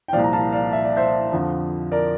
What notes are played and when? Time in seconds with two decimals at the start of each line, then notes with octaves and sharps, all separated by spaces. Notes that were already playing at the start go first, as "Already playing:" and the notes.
0.08 G5
0.13 C2 A#2 F3 D5 F5
0.24 A#5
0.33 F5 A5
0.53 D5 F5
0.73 E5
0.84 D5
0.97 C5 E5
1.32 F2 D3 F3
1.92 A#4 D5